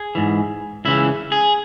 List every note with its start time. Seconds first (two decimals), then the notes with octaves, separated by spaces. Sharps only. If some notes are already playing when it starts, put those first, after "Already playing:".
Already playing: G#4
0.15 G#2 E3
0.85 C#2 C#3 E3 E4
1.32 G#4